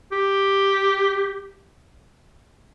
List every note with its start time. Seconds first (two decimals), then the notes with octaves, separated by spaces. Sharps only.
0.12 G4